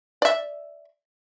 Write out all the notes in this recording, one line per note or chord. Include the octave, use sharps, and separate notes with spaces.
D5 E5